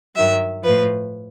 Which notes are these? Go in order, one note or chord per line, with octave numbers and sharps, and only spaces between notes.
G2 D#3 F#3 E5
A2 F3 B4